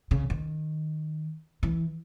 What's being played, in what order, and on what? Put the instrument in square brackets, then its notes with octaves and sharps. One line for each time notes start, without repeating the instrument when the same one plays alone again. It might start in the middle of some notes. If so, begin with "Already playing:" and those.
[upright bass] C#3
D#3
E3